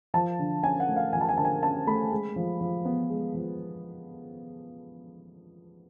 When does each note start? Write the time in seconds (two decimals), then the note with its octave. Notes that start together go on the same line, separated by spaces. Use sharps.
0.14 F3 A5
0.39 D3
0.63 C#4 G#5
0.80 F#5
0.88 A3
0.96 F5
1.13 F3 G#5
1.21 A5
1.29 G#5
1.37 D3 A5
1.45 G#5
1.62 C#4 A5
1.87 A3 B5
2.11 G#3
2.36 F3
2.61 F3
2.85 B3
3.10 G#3
3.34 F3